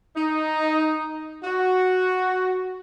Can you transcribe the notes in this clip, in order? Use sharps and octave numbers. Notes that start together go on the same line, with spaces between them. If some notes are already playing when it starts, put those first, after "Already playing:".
D#4
F#4